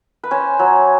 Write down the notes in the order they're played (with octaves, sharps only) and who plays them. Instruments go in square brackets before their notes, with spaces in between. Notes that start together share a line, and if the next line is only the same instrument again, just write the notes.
[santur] B4
C#4 C5
F#3